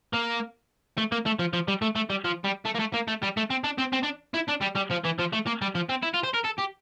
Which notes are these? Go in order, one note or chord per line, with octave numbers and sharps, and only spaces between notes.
A#3
A3
A#3
A3
F3
F3
G3
A3
A3
G3
F3
G3
A3
A#3
A3
A#3
A3
G3
A3
C4
D4
C4
C4
D4
E4
D4
G3
G3
F3
E3
F3
A3
A#3
G3
F3
C4
E4
F4
C5
A#4
A4
G4